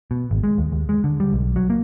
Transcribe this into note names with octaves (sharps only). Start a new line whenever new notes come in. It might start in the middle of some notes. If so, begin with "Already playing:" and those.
B2
G#1
G#3
D#2
D#2
G#3
D3
G3
B1
F#3
A#3